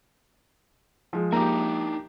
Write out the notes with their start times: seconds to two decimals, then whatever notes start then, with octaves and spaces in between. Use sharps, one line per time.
1.13 F3 G#3
1.32 A#3 D4 D#4 G4 E5 A#5